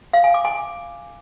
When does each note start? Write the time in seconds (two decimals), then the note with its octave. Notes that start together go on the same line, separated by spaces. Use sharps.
0.13 F5
0.24 G#5
0.34 D6
0.45 G#5